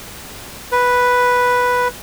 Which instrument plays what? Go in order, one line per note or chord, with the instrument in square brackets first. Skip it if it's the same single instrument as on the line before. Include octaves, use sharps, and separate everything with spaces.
[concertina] B4